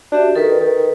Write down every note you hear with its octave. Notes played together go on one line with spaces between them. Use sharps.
D4 F#4 G4 E5
D#3 A4 B4
D#3